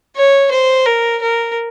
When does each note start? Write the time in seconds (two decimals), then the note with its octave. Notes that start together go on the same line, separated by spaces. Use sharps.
0.16 C#5
0.52 C5
0.86 A#4
1.22 A#4